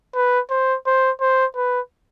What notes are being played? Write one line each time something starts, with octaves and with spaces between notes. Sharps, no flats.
B4
C5
C5
C5
B4